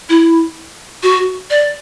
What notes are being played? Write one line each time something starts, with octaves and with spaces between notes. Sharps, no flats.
E4
F#4
D5